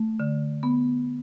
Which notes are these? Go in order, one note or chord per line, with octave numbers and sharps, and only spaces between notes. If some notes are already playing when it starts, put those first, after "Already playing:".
Already playing: A3
D3
B3